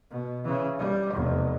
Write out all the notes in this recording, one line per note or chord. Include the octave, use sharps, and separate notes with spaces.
B2
C#3 E3
G3
F1 E2